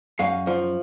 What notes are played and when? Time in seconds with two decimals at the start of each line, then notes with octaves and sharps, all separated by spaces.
0.19 F#2 F5 G#5
0.47 F3